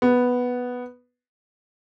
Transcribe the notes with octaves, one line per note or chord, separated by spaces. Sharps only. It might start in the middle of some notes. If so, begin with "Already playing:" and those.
B3